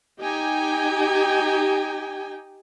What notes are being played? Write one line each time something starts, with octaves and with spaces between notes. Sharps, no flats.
D#4 G4 G5 G#5